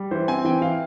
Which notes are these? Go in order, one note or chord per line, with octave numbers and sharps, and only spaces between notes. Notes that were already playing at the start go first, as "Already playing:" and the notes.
Already playing: G3
E3 C5
C4 G#5
E3 G5
E3 F5